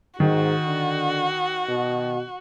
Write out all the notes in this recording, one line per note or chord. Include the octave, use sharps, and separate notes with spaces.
G#2 D#3 F#4
D3
B2